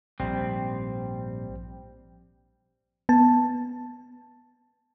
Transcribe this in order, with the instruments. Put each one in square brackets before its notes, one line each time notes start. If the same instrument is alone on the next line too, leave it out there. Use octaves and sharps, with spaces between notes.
[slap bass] A#1 G#2 [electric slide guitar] G3 C4
[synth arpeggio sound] B3 A5